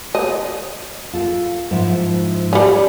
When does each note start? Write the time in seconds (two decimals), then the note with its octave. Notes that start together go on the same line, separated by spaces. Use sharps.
0.15 D#5
1.13 F4 A4
1.71 G#2 F3 E4
2.53 G3 C#4